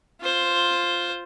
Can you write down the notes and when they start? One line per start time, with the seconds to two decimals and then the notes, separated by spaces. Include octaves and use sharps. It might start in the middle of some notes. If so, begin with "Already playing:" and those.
0.21 F4 C5